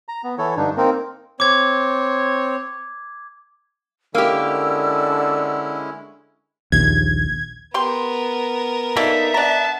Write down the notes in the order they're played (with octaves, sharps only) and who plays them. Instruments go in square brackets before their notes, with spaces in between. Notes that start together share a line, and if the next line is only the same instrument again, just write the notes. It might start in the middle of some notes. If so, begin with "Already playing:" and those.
[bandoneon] A#5
B3
E3 E4 A4 C#5
G2 D3 D4 D#4
A#3 C4 D#4 A#4
[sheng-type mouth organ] C4 C#5 [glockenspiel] D6 G#6
[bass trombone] D3 [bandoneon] G#3 C#4 E4 [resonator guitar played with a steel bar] A#3 G4 [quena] E6
[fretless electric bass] A#1 D#2 [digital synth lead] G#6
[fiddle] B3 A#4 [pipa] G4 C6
[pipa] A#3 D4 A4 [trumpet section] D#4 [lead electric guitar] E5
[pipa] D4 A#5 [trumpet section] D#5 F#5 A5